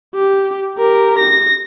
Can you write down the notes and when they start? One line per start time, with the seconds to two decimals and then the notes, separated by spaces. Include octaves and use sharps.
0.14 G4
0.76 G4 A#4
1.19 A#6